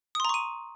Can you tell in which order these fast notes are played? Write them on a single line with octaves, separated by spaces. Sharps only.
D#6 C6 A#5 C#6 D#7